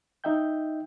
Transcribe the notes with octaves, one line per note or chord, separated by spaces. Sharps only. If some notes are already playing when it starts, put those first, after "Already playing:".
D#4 D#5 E5 G5 G6